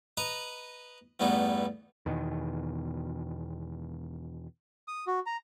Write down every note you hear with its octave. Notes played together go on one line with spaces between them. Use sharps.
B4 D#5 A#5 B5
E2 G2 A3 B3 D#4
E2 B2 D#3
D#6
F#4
A#5